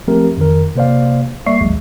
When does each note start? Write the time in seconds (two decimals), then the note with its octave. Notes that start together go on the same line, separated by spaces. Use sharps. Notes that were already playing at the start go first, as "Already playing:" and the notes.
0.08 F3 A3 C4 G4 A#4
0.37 F2 D#3 A#4
0.76 C3 A#3 C5 D5 F5
1.46 G3 A#3 D5 E5 C#6 C7
1.61 A1 D#2 F#3 G#3